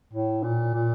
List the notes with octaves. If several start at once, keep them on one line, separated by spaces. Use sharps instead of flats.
A2
A#2
A#2